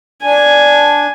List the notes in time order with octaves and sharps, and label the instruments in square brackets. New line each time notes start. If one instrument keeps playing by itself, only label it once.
[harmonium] D4 [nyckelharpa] G#5